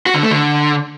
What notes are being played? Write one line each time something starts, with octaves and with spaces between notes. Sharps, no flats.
F#4
D3
A3
D3